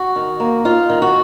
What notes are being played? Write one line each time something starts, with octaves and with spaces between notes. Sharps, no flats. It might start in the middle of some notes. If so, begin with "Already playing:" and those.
Already playing: F#4
D#3
A#3
D#4 F4
D#3
F#4